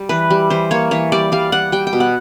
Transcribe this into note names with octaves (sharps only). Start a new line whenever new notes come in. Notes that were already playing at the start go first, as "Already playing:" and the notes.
Already playing: G3
E3 B4
G3
E3 C5
A#3 C#5
E3 C#5
G3 D5
G3 F5
G3 F#5
G3 G5
G5
B2
F#5